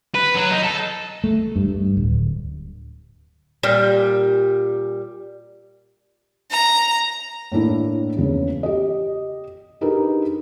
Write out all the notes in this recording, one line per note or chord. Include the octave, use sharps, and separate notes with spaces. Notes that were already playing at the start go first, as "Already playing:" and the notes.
B4
F#3
D#4
A4
A3
G2
G2
D1
A#2 G3
A#5
A2 A#3 D4 E4
E2 C#3
G4 D#5
D4 D#4 G4 G#4 A#4 B4